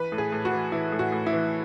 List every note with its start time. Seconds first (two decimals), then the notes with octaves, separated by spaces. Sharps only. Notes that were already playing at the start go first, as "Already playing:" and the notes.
Already playing: E3 B4
0.12 A2
0.18 G#4
0.32 A2
0.45 F#4
0.52 E3
0.72 E3 E4
0.92 A2
0.99 F#4
1.12 A2
1.26 E4
1.33 E3